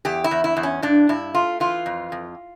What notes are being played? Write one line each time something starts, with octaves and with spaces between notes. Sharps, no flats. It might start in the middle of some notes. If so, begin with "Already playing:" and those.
E2 G4
E4
E2
E4
E2
C#4
G2 D4
G2 E4
A3 F4
E3 F4
F2
F2